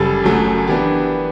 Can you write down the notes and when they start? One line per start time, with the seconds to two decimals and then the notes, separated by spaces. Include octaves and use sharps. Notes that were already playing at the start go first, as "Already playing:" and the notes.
Already playing: F#1 G3 A4
0.23 F#1 F#2 F#3 A3
0.67 E3 B3 D4 G4